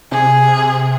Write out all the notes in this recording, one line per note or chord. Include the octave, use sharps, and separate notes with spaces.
C3 G#4